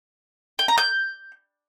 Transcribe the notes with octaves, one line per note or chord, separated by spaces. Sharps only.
G5
A#5
G6